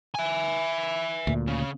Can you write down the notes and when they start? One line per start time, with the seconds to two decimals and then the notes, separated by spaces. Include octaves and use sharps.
0.15 E5 G#5
1.27 D2 A#2
1.48 C#3